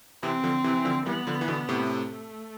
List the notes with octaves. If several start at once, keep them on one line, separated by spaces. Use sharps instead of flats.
C3 E3 C4
D3 F3
C3 E3
E3
D3 F3
E3 G3 B3
D3 F3
E3
B2 D3
A2 C3
A3